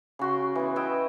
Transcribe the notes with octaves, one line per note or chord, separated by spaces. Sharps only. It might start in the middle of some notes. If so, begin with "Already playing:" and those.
C#3 F#4 C6
E3 B3
E4 D#5 E5 G5